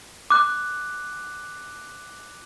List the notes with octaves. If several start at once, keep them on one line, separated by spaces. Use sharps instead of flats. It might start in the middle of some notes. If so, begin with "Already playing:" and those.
D6 F#6